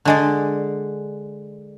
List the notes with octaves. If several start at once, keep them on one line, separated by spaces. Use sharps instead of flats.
D3 G#3 D5